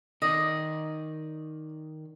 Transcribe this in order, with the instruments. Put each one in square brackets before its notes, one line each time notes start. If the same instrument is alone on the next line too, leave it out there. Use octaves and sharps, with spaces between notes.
[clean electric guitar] D#3 D5 [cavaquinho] D#5